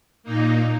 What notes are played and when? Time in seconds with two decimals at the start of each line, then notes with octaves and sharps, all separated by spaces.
0.23 A#2 A#3 D#4